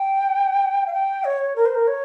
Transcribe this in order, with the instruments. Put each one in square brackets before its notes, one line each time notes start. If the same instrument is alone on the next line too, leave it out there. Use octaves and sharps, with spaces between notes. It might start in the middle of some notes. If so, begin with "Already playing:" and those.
Already playing: [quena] G5
F5
G5
C#5
A#4
C5
A#4
C#5